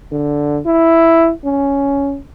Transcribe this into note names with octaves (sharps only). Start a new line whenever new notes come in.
D3
E4
C#4